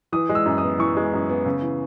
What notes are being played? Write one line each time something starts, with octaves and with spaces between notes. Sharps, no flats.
E3 D#6
G#3
E6
F#2
D#6
B3
E3 C#6
G#3
F#2
B3
C#3
E3